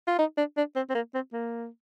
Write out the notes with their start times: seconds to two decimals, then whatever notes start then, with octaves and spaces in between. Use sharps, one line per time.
0.07 F4
0.18 D#4
0.38 D4
0.57 D4
0.76 C4
0.89 C4
0.95 A#3
1.14 C4
1.33 A#3